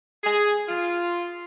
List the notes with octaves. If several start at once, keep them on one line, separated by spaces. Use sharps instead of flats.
G#4
F4